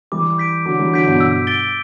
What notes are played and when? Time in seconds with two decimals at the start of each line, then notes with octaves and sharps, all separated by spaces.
0.12 E3 G3 D6
0.38 G6 B6 D7
0.66 D3 F#3 D6
0.79 E3 G3
0.93 D3 F#3 G6 B6 D7
1.07 G2 B2
1.20 E6
1.47 A6 D7 G7